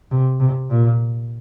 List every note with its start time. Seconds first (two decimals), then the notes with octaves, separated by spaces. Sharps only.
0.11 C3
0.40 C3
0.70 A#2